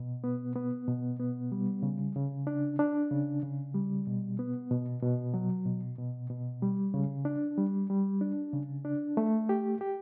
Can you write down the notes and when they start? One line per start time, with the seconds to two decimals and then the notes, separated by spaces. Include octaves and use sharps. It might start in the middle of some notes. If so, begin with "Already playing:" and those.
Already playing: B2
0.24 B3
0.56 B3
0.88 B2
1.19 B3
1.52 G3
1.83 C#3
2.15 C#3
2.47 D4
2.79 D4
3.11 C#3
3.43 C#3
3.74 G3
4.07 B2
4.39 B3
4.71 B2
5.03 B2
5.34 F#3
5.66 B2
5.98 B2
6.30 B2
6.62 G3
6.94 C#3
7.25 D4
7.58 G3
7.90 G3
8.21 D4
8.53 C#3
8.85 D4
9.17 A3
9.49 G4
9.81 G4